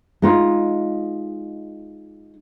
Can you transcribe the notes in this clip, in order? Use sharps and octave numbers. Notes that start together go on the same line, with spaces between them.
G#3 D#4 F4